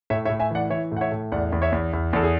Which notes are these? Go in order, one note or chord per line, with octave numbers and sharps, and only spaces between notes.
A2 C#5 E5
C#5 E5
A2
E5 G#5
E3 D5 F#5
E3 C#5 E5
A2 F#5
C#5 E5
A2
E2 D5 F#5
E2
C#5 E5
E2
E2
E2 A4
G#4